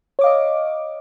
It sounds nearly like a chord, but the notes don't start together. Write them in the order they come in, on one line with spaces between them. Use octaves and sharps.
C#5 D6 F5 D#5